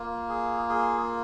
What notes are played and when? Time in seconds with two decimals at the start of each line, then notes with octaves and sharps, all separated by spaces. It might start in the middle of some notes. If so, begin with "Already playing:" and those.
Already playing: A#3 F4
0.29 G#4
0.69 G#4